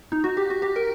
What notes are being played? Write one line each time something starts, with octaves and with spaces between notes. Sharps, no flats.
D#4
F#4
G4
F#4
G4
A#4